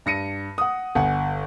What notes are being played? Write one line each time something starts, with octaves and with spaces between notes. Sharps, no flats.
G2 A#6 C#7 D#7
F#5 D#6
G1 F#5 G#5